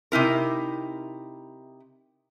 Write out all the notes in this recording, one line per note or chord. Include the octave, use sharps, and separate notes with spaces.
C3 D#4 E4 A#4